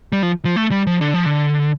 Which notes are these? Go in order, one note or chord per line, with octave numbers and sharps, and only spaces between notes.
G3
F3
F3
A3
G3
F3
D3
F3
D3